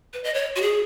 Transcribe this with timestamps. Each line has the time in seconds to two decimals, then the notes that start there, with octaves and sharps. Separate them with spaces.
0.13 B4
0.24 D#5
0.34 C#5
0.56 F#4
0.62 G#4